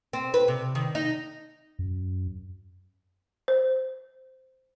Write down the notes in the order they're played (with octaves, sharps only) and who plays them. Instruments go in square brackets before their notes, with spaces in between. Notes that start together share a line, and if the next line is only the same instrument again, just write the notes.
[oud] C4
B4
C3
D#3
D#4
[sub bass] F#2
[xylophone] C5